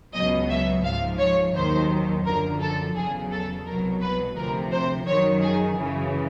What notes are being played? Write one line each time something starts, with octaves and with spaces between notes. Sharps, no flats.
C#2 B2 F#3 D#5
E5
G#2 F3 F5
C#5
D#2 D#3 F#3 C5
F#2 D3 F3 A#4
A4
E2 C#3 F#3 G#4
A4
C2 B2 F#3 A#4
B4
D2 C3 F3 A#4
C5
F#2 D#3 F#3 C#5
G#4
F#2 C#3 E3